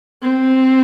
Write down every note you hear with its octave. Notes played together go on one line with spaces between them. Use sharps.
C4